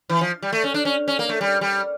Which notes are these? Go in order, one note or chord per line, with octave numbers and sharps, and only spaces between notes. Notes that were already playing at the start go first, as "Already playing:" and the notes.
E3
F3
G3
A3
C#4
D4
C#4
C#4
A#3
A3
G3
G3